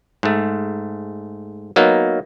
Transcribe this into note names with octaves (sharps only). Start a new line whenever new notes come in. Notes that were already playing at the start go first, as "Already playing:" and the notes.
G#2 A3
F#3 A#3 B3 D#4